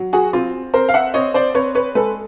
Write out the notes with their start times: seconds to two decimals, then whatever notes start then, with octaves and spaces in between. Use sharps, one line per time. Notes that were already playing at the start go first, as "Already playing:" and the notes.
Already playing: F#3
0.13 F#4 G#4
0.33 C4 F4
0.74 C4 A#4 C5
0.89 F5
0.94 E5 F#5
1.14 C4 C#5 D#5
1.34 C5 D5
1.54 C4 B4 C#5
1.75 B4 C#5
1.95 G#3 A4 B4